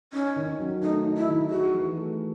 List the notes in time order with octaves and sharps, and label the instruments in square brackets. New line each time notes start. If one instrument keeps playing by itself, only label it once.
[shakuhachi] C#4 [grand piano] D#4
[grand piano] D#3
F#3
[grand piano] A3 [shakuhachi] D#4
[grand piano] D#4
[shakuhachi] E4
[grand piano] D#3
[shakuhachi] F#4 [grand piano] G#4
[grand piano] E3
A3